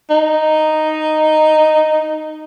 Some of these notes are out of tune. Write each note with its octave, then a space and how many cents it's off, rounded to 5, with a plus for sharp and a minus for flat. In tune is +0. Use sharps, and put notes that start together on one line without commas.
D#4 -5